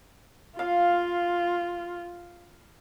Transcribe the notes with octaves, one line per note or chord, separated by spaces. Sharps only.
F4 F5